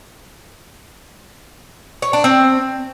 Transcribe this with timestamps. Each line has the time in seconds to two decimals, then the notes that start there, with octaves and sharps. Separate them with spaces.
2.02 C#5
2.13 D4
2.24 C4